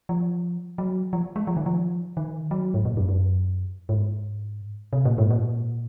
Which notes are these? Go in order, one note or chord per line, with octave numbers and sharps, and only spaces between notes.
F3
F#3
F3
G#3
F3
D#3
F3
D#3
F#3
G#2
A#2
F#2
F#2
G#2
C3
A#2
G#2
A#2